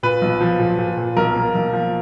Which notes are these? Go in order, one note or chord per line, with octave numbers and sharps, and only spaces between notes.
A#2 B4
B1
F3
A#2
A#2
A#2
B1 A#4
A#3
B1
F3